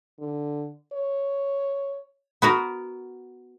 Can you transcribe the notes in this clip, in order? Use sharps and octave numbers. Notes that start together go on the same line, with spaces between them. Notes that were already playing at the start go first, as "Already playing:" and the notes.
D3
C#5
B3 F#4 A#4